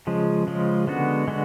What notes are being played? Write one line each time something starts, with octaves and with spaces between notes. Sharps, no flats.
C#3 F3 G#3
C#3 F3 G#3
D3 G#3 B3 F#4
D3 G#3 B3 F#4